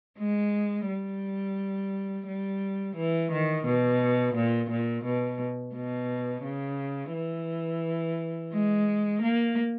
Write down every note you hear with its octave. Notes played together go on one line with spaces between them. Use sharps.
G#3
G3
G3
E3
D#3
B2
A#2
A#2
B2
B2
C#3
E3
G#3
A#3